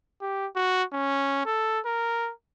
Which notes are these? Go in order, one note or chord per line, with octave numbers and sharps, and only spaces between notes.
G4
F#4
C#4
A4
A#4